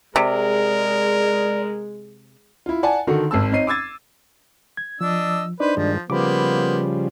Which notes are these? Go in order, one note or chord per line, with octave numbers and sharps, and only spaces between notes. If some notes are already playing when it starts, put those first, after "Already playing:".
C3 G#3 A#4 D5
E4 F4
D5 F#5 G#5 A5
D3 D#3 F#4 A4
G#1 C4 A5 E6
C4 D#4 C#5 C7 D#7
D6 E6 G#6 A6
G#6
F3 D4 D#5 E6
D4 D#4 B4 C5 D5
G2 D#3 F3 G#3
C#3 F3 G3 A#3 B3 C5 B5 D6